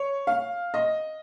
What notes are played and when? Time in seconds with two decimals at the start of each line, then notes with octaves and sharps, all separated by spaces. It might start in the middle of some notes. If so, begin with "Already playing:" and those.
Already playing: C#5
0.27 F5
0.74 D#5